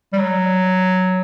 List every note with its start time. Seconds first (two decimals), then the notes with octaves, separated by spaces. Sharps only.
0.13 G3
0.18 F#3